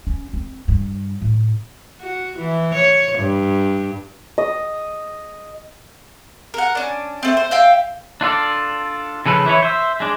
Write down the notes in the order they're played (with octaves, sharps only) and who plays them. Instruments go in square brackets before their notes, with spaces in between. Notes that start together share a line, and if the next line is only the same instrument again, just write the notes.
[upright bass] C#4
C4
G2
A2
[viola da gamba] F#4
E3
C#5
G2
[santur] D#5
[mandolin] A#4 F#5
C#4 D4
A3 C4
C5
E5 F5 G5
[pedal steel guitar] D4 F4 A4 D5
C#3 F3 A4 B4
E3 E4 C#5
C5 E5
G#3 D4